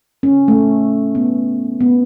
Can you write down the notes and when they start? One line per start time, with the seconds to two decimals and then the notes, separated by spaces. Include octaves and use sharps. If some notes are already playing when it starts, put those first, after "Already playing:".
0.23 C#4
0.48 A3
1.15 B3
1.81 B3